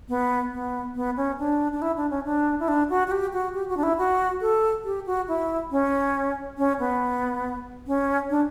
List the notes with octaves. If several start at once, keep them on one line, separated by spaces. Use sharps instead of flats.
B3
B3
B3
C#4
D4
D4
E4
D4
C#4
D4
E4
D4
F#4
F#4
G4
F#4
G4
F#4
D4
E4
F#4
A4
G4
F#4
E4
C#4
C#4
B3
C#4
D4